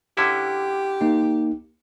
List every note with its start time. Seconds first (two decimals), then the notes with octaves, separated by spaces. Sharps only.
0.17 D3 C#4 E4 G4
1.01 A#3 D#4